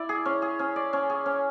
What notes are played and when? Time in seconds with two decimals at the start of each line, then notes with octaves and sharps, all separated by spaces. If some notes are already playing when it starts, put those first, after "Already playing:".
Already playing: E4 D5
0.09 G#4
0.26 C#4
0.42 G#4
0.59 C#4
0.76 D5
0.93 C#4
1.10 G#4
1.26 C#4